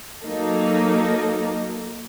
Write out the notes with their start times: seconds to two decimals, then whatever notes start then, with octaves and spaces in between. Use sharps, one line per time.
0.25 F#3 A#3 D#4 A4